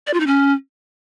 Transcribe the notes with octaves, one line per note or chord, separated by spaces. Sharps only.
D5
F4
D#4
C#4